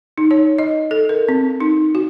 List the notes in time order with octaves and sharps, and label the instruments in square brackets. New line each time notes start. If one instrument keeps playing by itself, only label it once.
[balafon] D#4
C#5
D#5
A4
A#4
C4
D#4
F#4